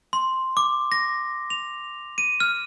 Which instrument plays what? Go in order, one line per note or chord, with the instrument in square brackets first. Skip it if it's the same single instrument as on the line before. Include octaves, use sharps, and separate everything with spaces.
[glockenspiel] C6
D6
A#6
F7
D#7
F6